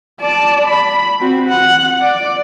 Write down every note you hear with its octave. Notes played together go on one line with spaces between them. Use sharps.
D5 A5
B5
C4 F#4
F#5
D5